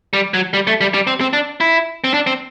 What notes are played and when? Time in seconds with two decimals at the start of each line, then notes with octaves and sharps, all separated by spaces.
0.13 G3
0.34 F#3
0.54 G3
0.67 A3
0.81 G3
0.94 G3
1.07 C4
1.21 C4
1.33 D4
1.60 E4
2.04 C4
2.14 D4
2.27 C4